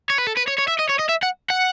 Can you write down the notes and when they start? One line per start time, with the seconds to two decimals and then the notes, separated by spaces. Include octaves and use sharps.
0.10 C#5
0.18 B4
0.27 A4
0.37 B4
0.47 C#5
0.58 C#5
0.68 E5
0.79 D#5
0.89 C#5
0.99 D#5
1.09 E5
1.23 F#5
1.50 F#5